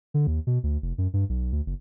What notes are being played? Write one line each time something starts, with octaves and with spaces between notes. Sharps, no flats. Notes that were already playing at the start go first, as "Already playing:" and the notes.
D3
D#2
B2
D2
F1
F#2
G2
B1
D2
F#1